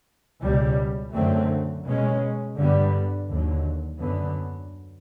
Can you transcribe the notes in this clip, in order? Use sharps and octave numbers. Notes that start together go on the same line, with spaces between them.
C#2 B2 G3
F#2 D3 F#3 A3 C4
B2 G#3 C#4
G2 D3 G3 B3
D#2 D3 F#3
F#2 D3 F#3 B3